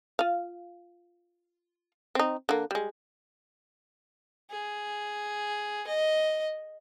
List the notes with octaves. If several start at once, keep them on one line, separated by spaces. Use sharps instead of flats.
F4 F5
C4 D#4
D3 A#3
G3 G#3
G#4
D#5